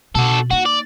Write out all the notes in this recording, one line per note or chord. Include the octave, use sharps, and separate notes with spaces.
B2 B3 F#4 A4
A#3 D#4 F#4
D5